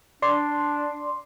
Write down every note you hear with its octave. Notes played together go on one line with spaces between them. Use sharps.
D4 D5 C6